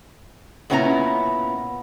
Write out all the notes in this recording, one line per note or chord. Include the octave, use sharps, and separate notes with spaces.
A#2 B3 C#4 E4 F4 A#5